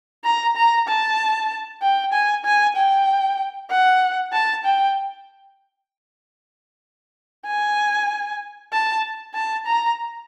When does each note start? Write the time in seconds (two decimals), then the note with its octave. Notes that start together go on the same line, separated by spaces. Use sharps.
0.25 A#5
0.56 A#5
0.88 A5
1.83 G5
2.13 G#5
2.45 G#5
2.76 G5
3.70 F#5
4.33 A5
4.65 G5
7.47 G#5
8.73 A5
9.34 A5
9.66 A#5